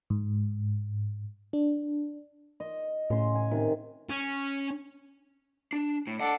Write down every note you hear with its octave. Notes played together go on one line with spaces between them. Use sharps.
G#2
D4
D#5
A2 C#3 C6
G#5
C3 D#3
C#4
D4
A2
D4 A4 D#5 F#5